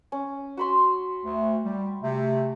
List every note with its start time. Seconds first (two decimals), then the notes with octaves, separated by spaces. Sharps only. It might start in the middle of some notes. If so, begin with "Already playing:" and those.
0.12 C#4
0.57 F#4 B5 C6
1.23 D2
1.63 G3
2.02 C3 A3